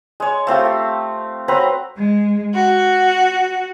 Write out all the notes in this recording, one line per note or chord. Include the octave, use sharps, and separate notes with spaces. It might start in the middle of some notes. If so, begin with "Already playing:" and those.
G#3 C#5
A3 C4 F4 G4
G4
F#3 C4 B4 A#5
G#3
F#4